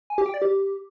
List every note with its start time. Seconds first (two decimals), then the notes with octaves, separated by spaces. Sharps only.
0.10 G#5
0.18 G4
0.26 G5
0.34 D5
0.42 G4